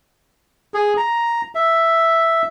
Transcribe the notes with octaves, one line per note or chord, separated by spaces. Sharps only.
G#4
A#5
E5